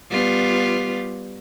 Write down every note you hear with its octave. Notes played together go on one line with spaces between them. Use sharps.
G3 B3 F4